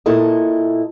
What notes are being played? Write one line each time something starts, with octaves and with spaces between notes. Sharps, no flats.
A#2 E4 A4 D#5